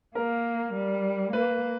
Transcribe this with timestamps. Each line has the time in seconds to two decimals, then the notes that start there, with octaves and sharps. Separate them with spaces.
0.15 A#3 A#4
0.74 G3
1.33 A#3 B4